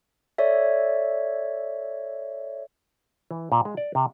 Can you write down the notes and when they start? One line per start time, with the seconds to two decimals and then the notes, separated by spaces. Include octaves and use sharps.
0.38 A4 C#5 D5 E5
3.31 E3
3.52 A#2
3.65 G#3
3.77 D5
3.95 C3